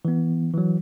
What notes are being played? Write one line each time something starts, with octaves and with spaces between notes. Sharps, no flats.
E3 B3
E3 F#3